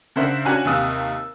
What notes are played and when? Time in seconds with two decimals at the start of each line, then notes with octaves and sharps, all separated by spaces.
0.16 C#3 D4 A#4 C5 E5 F#5
0.45 C#4 D4 F#4 G#5 F#6
0.65 D#2 C3 F5 D#6 E6